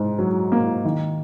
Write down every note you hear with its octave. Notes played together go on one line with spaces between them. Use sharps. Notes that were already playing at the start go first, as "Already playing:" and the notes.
Already playing: G#2
F#3
A#3
D#3